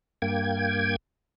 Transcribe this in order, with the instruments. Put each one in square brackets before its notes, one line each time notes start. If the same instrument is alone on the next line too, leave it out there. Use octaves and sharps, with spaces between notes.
[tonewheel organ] G2 A#3 G5 G#6